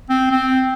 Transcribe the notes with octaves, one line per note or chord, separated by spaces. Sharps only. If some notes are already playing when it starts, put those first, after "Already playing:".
C4
C4